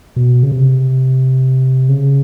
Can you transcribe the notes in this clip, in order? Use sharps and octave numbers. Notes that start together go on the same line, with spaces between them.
B2
C#3
C3
C#3